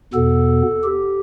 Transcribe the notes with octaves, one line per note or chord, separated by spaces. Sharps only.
E2 B2 B3 A4
G4